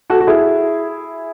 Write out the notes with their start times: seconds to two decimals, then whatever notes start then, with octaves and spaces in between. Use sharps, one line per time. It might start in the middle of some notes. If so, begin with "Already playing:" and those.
0.10 F#4 A4
0.21 F#4
0.27 E4 G#4